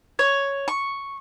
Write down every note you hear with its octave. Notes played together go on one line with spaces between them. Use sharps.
C#5
C#6